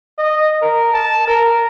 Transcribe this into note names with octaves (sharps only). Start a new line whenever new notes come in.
D#5
A#4
A5
A#4